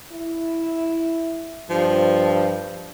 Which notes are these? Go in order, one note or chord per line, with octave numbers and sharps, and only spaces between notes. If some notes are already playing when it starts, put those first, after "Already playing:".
E4
G2 F3